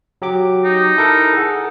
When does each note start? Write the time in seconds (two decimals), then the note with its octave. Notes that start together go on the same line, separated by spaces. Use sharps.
0.22 F#3 G4 D6
0.64 D#4
0.97 E4 A4 A#4
1.33 G#4 A4 F#5